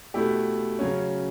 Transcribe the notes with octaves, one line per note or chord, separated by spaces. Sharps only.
B2 A3 E4 G4
C#3 F#3 C#4